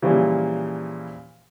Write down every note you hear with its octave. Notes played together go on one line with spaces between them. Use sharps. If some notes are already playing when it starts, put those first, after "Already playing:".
A#2 C#3 E3 F3 G3